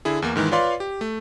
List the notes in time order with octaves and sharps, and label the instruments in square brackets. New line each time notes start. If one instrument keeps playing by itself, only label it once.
[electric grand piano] D3 E4 G#4
E2 A#3
G#2 D#3 E3 G#3
F4 B4 C#5 D5 F5 C6
G4
A3